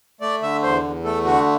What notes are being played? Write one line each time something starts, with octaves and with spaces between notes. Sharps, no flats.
A3 D5
D3 E5
E2 C5
E2
A3 A4
D3 F#4